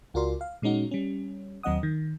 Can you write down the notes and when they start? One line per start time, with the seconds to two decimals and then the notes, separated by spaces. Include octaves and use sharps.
0.14 C#2 F4 F#4 A#4 D5 C6
0.41 F5
0.62 A#2 G#3 C#4 D#4 F#4
0.91 G3 C#4
1.63 D#2 F#3 C4 D#5 F#5 D#6
1.83 D#3